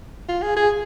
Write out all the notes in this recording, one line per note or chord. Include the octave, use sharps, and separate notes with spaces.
F4
G#4
G#4